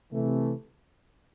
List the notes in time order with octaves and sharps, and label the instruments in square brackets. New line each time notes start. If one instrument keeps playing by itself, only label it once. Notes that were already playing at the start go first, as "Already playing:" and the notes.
[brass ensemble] C3 E3 A3